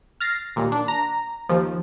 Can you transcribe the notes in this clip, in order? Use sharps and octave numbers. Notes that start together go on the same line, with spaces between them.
F6 A6 A#6 C7
D#2 A#2
D4
A#5
D#2 F3